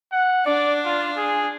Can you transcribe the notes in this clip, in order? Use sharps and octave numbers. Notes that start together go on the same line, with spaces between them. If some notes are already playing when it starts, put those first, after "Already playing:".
F#5
D4 D5
F4
G#4